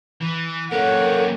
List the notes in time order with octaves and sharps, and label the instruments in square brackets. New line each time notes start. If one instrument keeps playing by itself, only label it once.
[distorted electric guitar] E3
[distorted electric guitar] F#2 G4 [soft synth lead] A#3 [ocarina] A4 [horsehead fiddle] C#5 F#5